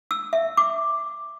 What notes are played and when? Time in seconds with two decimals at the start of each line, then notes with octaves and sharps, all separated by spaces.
0.11 E6
0.33 E5
0.57 D6